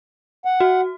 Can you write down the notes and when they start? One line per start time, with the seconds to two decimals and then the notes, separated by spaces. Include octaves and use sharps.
0.45 F#5
0.60 F#4